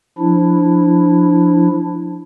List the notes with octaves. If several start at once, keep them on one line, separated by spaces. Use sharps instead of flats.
F3 D4 E4